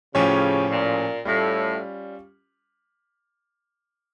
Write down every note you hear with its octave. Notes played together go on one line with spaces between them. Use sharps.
A2 C#3 F3 C#4 G4 C#5
A#2
A2 G3 C#4 F4